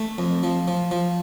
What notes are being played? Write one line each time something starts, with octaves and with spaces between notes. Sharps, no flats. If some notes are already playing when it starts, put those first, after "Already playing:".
Already playing: A3
F2
F3
F3
F3